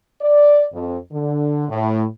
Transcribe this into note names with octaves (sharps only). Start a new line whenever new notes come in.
D5
F2
D3
A2